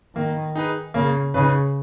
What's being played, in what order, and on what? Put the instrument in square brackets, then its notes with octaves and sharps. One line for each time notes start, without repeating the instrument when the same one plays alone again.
[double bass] D#3 [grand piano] A#3
[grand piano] D#4 G#4 B4
[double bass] C#3 [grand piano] A#3
[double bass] C#3 [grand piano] D#4 G#4 B4